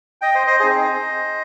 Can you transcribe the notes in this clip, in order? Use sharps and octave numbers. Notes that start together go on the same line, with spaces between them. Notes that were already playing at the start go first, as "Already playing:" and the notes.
D#5 G5
C5 D#5
C5 D#5
C4 D#4 G#4 C5 D#5